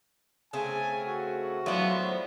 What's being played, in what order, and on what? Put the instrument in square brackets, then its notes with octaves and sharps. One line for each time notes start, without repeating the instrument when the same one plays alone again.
[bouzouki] C#3 A3 C4 [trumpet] G#5
[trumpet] F#4
[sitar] A2 B3 D5 [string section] F#3 [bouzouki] F4 C5